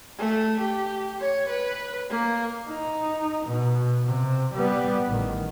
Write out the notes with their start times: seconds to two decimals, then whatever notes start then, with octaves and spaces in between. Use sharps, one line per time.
0.18 A3
0.60 G4
1.20 C#5
1.50 B4
2.10 A#3
2.68 D#4
3.46 B2
4.05 C3
4.54 G3 B3
5.06 A1 D#3